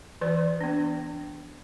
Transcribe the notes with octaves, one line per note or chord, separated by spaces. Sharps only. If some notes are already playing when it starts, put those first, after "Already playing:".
E3 B4 D5
B3 D4